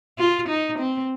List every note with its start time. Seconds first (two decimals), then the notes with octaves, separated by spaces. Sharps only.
0.18 F4
0.49 D#4
0.79 C4